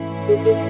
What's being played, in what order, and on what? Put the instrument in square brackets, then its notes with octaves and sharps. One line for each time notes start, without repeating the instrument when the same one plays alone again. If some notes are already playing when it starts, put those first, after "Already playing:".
Already playing: [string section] G#2 E3 A3 C#4 E4
[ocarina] G#4
A4